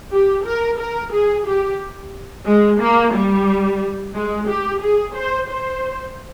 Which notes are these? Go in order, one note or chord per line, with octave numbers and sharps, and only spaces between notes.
G4
A#4
A#4
G#4
G4
G#3
A#3
G3
G#3
G4
G#4
C5
C5